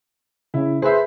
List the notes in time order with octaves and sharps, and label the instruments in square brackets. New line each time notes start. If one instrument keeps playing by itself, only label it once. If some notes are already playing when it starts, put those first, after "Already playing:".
[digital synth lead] C#3 [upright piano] E4
[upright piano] G#4 B4 E5 [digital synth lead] C5